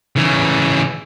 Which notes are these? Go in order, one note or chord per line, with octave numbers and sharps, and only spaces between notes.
C#3 E3